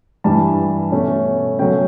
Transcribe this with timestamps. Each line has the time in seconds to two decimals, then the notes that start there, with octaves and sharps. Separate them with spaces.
0.24 G2 E3 G3 A5
0.92 B2 A3 C#4
1.59 B2 F#3 A3 C#4 G5